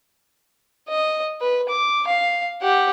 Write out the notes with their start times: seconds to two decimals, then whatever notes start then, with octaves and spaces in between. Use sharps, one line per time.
0.89 D#5
1.41 B4
1.69 D6
2.07 F5
2.62 G4 F#5